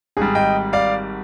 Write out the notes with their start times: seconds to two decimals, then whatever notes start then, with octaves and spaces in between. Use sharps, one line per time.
0.17 G#1 G#2 G3 G#4
0.35 D#5 G5
0.73 D5 F5